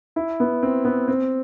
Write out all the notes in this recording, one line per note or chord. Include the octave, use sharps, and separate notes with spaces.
E4
B3
C4
B3
C4